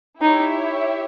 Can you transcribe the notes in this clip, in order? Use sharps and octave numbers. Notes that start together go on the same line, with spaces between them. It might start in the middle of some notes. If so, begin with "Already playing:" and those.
D#4 E4 G4 C#5 E5